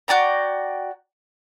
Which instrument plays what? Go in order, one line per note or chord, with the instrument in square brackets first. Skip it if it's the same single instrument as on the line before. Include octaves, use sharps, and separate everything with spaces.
[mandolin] F#4 D5 G5 A#5